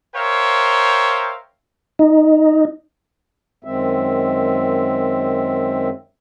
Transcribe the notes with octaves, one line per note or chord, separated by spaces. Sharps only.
A#4 C5 C#5 E5 F5 G5
D#4
F#2 D#3 G#3 C4 E5